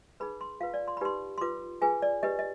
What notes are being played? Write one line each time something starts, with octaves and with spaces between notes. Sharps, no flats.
D#4 G#4 B4 B5
C6
F4 B4 F5
D5
C6
B5
D#4 G4 B4 C6
C6
F4 B4 D6
F4 G#4 B4 G#5
D5
D4 G4 B4 D#5
D#5